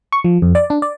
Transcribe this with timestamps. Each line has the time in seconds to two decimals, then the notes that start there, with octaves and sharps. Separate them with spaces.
0.12 C#6
0.24 F3
0.42 F2
0.55 D5
0.70 D4
0.82 D5